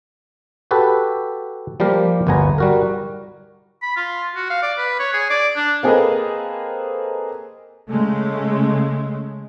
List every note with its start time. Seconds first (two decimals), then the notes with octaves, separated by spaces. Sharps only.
0.71 F#4 G4 A4 B4
1.80 F3 G3 A#3 G4 A#4
2.27 G1 D2 B3 G#5 A#5
2.58 G3 F#4 A#4
3.82 B5
3.96 F4
4.36 F#4
4.50 F5
4.62 D5
4.78 B4
4.99 C#5
5.13 G#4
5.30 D5
5.56 D4
5.83 A#3 C4 G#4 A4 B4 D#5
7.90 C#3 G#3 A3